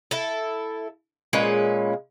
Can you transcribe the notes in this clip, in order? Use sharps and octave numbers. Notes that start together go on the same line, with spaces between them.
E4 A4
A#2 G#3 C#4 B4